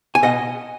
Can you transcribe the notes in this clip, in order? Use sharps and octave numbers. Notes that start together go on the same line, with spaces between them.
G#5
B2 D#5 F#5